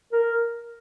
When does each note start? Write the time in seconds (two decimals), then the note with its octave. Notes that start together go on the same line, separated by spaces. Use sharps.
0.13 A#4